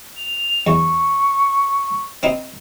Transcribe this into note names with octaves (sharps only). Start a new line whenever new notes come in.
F7
E2 C#6
C4 D#4